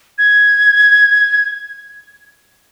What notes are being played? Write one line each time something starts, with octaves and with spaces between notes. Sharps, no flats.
G#6